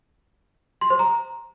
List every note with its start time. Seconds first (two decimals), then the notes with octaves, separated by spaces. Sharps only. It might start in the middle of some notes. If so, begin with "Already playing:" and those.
0.81 C6
0.90 C5
0.99 A#5